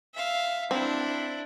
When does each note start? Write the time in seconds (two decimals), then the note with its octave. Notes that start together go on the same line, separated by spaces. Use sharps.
0.14 E5 F5
0.71 C4 D4 E4